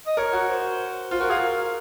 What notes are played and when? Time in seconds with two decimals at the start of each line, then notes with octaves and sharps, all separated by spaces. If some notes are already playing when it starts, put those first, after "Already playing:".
0.07 D#5
0.17 A#4 C#5
0.33 F#4
0.49 C5
1.11 F4 C5
1.20 F#4 A#4
1.29 G#4 F5
1.39 A#4